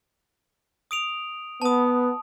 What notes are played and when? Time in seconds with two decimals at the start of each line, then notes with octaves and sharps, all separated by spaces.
0.91 D#6 D7 F7
1.62 B3 A5 D#6